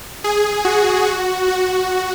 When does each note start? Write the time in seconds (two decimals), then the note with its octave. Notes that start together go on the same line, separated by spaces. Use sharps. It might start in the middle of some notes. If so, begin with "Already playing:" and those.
0.24 G#4
0.65 F#4
1.06 F#4
1.48 F#4